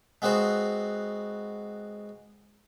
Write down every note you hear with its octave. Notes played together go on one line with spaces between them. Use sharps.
G#3 B3 C4 F#4 C5